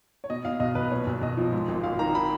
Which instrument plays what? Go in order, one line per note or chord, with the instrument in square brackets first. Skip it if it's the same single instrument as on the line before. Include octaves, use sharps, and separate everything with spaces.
[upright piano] C#5
B2 D#5
B2 F5
B1 D#5
B1 B4
A#2 C#5
B1
B1 D#5
F3
G#2
G#1
G#1 F5
D#3 A#5
B5